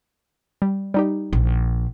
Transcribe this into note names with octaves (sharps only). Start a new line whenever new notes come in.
G3
G3 D#4 G4
A#1